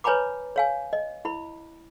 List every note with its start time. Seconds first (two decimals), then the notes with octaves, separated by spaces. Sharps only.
0.04 B4 C#5 G#5 A#5 B5 D6
0.56 C#5 F5 G#5
0.93 D#5
1.25 E4 B5